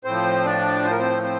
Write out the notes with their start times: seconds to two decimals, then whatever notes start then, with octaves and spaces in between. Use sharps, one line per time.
0.05 A2 F3 C4 C5
0.45 D4 D5
0.84 C5
0.91 A#4
0.99 C4 C5
1.23 C4 C5